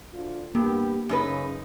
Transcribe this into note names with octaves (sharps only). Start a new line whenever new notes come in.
D2 D4 F4
G2 A#3 B3 G4
F#2 C#3 D#4 B4